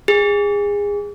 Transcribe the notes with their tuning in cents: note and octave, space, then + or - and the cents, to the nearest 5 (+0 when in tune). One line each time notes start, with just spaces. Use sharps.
G#4 -25